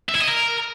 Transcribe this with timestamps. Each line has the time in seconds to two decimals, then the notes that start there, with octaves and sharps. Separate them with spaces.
0.09 E5
0.15 E4
0.21 D#5
0.28 A#4